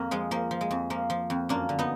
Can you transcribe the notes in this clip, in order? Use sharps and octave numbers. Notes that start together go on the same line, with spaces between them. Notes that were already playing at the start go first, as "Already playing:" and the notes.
Already playing: F2 A#3
F3 G#3
F3 A#3
F3
G#3
F2
F3 A#3
F3
F2
F#2 A#3 D4
D3
B3 D#4